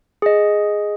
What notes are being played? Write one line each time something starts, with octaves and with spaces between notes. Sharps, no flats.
G#4 D#5